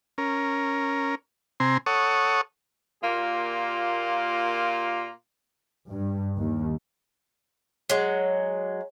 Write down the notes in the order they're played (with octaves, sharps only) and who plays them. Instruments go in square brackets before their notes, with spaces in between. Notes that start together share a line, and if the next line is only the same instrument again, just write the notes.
[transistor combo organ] C#4 A#4
C3 C4 G#5 A#5 C6
A4 C#5 F#5 C#6 D#6
[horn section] A#2 A#3 F4 G4
[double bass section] G2
D#2
[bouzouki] F#3 G#3